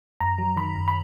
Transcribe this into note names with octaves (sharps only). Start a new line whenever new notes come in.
F#2 A#5
F#3
D#3 B5
F#2
B5